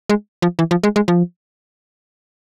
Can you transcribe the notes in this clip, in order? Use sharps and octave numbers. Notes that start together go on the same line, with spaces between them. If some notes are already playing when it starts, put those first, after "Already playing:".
G#3
F3
E3
F3
G#3
G#3
F3